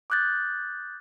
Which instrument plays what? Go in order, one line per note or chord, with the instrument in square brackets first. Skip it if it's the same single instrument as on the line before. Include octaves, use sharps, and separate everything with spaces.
[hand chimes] D6 D#6 F#6 G6 A6